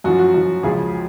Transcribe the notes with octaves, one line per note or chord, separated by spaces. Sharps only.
F#2 F3 F#4
F#4
F#2 F3
C#2 C#3 F3 G#4